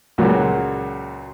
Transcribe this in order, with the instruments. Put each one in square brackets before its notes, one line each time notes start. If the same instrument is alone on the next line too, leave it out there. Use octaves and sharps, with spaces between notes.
[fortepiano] C#2 A#2 F#3